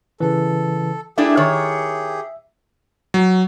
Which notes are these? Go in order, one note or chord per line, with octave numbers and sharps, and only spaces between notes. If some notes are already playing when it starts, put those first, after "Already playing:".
C#3 E3 A4
A3 D4 E4 G4 G#4 E5
D#3 C#5
F#3